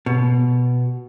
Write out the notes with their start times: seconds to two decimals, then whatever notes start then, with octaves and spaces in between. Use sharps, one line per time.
0.06 B2